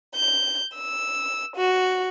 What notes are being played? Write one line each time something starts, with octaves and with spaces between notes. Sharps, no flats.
G6
E6
F#4